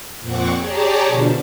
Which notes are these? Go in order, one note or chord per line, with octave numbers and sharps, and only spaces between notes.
F2 A#2 C4 F#5 C#6 D6
G4 G#4 C#5 D5 A5 A#5
B2 D3 F3 D4